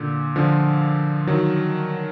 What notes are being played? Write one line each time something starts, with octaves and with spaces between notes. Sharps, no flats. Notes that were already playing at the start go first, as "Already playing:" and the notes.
Already playing: A#2 D3
D3 F3
D#3 F#3